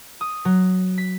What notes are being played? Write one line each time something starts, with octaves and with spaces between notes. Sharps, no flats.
D#6
F#3
B6